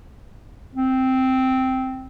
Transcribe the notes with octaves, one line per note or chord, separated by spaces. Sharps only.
C4